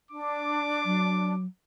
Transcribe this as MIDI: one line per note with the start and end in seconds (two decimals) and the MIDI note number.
0.11 1.33 62
0.11 1.41 86
0.85 1.45 54